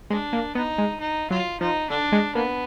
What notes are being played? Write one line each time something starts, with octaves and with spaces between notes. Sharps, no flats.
G#3 D4
A#3
B3 D#4
G#3
D#4
F#3 F4
F3 D#4
D3 D4
G#3
A#3 B3